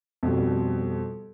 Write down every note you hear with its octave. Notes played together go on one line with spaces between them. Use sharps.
F2 B2 G3